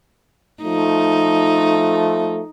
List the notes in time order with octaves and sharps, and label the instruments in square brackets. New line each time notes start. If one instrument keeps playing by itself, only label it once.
[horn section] F3 A3 [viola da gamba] D#4